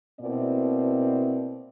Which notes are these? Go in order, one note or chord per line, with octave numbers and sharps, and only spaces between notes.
B2 A#3 C4 E4 D5